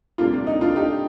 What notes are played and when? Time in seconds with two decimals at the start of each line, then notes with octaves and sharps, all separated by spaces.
0.18 C3 G3 A#3 D4 F4
0.34 D4
0.47 D#4
0.61 D4 F4
0.76 D#4 G4